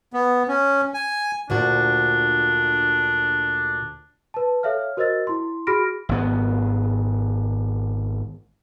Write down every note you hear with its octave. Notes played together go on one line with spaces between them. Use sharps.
B3
C#4
G#5
D2 A#2 D4 F#4
B4 A5
A4 C#5 E5 F5 F6
F#4 A#4 C5 D#5 E6 A6
E4 C6
F#4 G#4 B5 F6 A#6 D7
G#1 B3